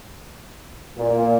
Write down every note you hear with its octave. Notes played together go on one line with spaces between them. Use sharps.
A#2